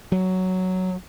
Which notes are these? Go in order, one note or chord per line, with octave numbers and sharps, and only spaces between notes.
F#3